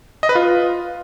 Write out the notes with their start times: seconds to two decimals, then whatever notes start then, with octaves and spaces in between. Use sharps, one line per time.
0.23 D#5
0.29 B4
0.35 F4